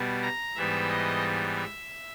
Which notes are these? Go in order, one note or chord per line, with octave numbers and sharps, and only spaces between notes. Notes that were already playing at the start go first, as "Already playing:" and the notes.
Already playing: B2 G3 B3
A#5
G#2 E3 G3 B3 E5
D#5
E5